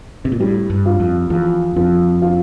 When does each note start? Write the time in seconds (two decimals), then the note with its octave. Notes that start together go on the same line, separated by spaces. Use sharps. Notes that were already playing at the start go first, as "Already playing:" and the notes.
0.25 C3
0.32 A#2
0.40 A2 G3
0.70 G2
0.86 F4
1.00 F2
1.30 E2 F3
1.76 F2 F3
2.22 F4